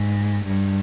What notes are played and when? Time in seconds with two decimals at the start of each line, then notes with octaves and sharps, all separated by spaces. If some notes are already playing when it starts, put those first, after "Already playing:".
Already playing: G#2
0.44 G2